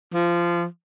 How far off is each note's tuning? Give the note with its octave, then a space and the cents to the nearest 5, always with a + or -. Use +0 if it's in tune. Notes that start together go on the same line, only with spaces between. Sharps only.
F3 -20